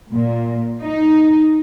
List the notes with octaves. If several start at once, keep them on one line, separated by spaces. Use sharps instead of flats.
A#2
D#4